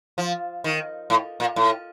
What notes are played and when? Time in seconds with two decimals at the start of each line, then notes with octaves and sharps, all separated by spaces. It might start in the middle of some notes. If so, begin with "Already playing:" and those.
0.18 F3
0.64 D#3
1.10 A2
1.40 A#2
1.56 A2